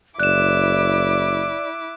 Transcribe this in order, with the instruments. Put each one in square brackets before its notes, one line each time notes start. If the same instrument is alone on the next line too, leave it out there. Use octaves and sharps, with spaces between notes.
[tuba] F#1 [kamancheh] E4 D6 [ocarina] D5 [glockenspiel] F#6 E7